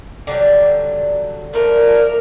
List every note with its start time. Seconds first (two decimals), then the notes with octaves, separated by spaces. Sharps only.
0.27 D3 F#3 G3
1.53 F3 A3 D4 A#4